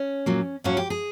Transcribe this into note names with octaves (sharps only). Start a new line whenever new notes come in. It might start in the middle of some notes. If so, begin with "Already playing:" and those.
Already playing: C#4
A#2 F#3 A#3
A2 F#3 A#3 C#4
G4
G#4